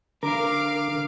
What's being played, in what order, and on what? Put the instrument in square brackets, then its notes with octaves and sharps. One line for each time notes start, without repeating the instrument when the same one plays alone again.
[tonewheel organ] D3 [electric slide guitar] A#4 [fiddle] F5 D6